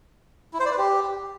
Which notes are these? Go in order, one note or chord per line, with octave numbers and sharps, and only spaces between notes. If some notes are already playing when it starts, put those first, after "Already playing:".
E4
C5
D5
B4
G4